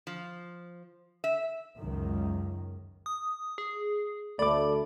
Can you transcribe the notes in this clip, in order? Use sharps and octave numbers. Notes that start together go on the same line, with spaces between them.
F3
E5
C#2 F#2 D#3
D#6
G#4
D2 A3 D5 B5 D6